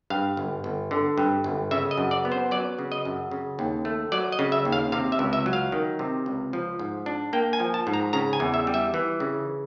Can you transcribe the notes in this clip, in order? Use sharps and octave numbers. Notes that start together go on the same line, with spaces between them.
G2 F5
G1
G1
D3
G2
G1
C#3 E5
D#5
F#2
D5
B3
C5
F#3 D5
C#3
D#5
F#2
C#3
D#2
A3
F#3 D5
D#5
C#3
E5
D#2
F5
C3 F5
E5
C#2
E5
F#3
F5
D#3
C3
C#2
F3
G#2
D4
A#3 G5
G#5
F3
A5
G#2
A#5
C#3 A#5
G#5
E2
E5
G3
E5
E3
C#3